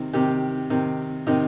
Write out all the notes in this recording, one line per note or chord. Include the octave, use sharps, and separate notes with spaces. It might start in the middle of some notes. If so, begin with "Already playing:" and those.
Already playing: C3 D#3
C3 D#3 G4
C3 D#3
C3 D#3 D#4